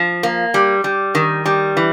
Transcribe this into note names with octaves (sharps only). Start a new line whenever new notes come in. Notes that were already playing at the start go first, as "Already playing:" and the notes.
Already playing: F3
A#3
G3
G3
D#3
G3
E3